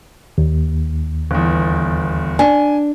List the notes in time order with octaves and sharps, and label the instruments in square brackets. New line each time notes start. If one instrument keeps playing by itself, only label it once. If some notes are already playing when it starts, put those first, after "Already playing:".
[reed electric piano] D#2
[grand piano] G1 E2
[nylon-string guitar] D4 [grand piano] G#5